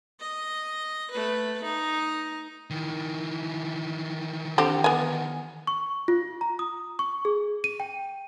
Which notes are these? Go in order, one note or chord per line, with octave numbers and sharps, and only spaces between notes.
D#5
A3 B4
D#4
D#3 E3
D3 C4 G4
B3 G#5
C#6
F4
A#5
D#6
C#6
G#4
D#7
G5